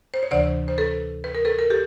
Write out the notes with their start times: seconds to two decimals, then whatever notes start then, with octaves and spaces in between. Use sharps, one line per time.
0.14 C5
0.23 C#5
0.31 D2 C3 E3 C5 D5
0.68 C5
0.78 A4 B4
1.24 B4
1.35 A#4
1.45 A4 B4
1.59 A#4
1.70 G4 A4